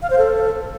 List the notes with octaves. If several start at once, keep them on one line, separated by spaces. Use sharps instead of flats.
F5
C5
A4